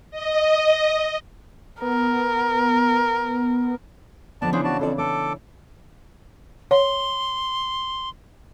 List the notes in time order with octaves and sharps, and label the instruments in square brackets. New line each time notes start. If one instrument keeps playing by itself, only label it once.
[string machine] D#5
[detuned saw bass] B3 [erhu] A#4
[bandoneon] F2 D5 A5 [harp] D3 [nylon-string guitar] F3 B3
[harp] C#3 E3 D4 [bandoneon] G#4 C5
[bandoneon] F#4 D5 A5
[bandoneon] F2 [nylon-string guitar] C4 A4 D5
[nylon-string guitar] B3 [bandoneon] A4 D6
[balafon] C#5 [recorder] C6